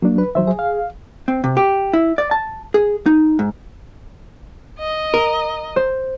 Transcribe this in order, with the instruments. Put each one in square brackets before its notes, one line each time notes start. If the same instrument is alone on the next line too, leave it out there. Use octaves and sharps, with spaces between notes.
[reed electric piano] F#3 D4 [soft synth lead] A#3
[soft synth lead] B4
[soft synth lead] D#3 [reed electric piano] F#3 C5 E5
[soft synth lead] G#4
[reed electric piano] F5
[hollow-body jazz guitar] C4
C3
G4
E4
D5
A5
G#4
D#4
G#2
[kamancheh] D#5
[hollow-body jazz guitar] A#4
[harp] C5